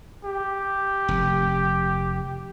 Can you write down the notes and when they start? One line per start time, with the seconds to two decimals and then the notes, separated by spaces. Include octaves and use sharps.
0.25 G4
1.08 F1